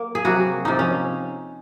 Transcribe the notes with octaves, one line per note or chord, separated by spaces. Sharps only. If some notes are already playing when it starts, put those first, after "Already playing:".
Already playing: A#3 A#4
G#4
C3 F#3 A#3 F#4
C3 F3 A#3 D#4
C#4